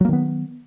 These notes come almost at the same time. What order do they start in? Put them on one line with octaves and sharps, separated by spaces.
F#3 A#3 D#3 B3